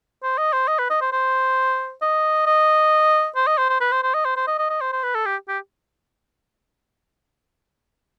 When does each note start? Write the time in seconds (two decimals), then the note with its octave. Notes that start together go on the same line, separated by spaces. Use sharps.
0.23 C5
0.38 D#5
0.53 C5
0.68 D#5
0.79 B4
0.90 D#5
1.02 C5
1.13 C5
2.02 D#5
2.47 D#5
3.36 C5
3.47 D#5
3.58 C5
3.69 C5
3.81 B4
3.92 C5
4.03 C5
4.14 D#5
4.25 C5
4.36 C5
4.48 D#5
4.58 D#5
4.70 D#5
4.81 C5
4.92 C5
5.03 B4
5.15 A4
5.26 G4
5.48 G4